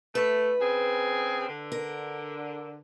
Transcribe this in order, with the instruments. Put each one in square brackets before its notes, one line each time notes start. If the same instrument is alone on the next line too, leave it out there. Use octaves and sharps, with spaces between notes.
[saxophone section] A3 [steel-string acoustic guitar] B4
[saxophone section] C#3 C4 G#4
D3
[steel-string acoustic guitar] A#4